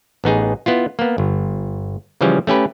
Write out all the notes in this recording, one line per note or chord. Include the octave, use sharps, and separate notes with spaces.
A1 B3 D#4 G#4
B3 E4 F4
A#3 B3
G1
C#3 E3 F3 G3 C#4
A3 C#4 G4 B4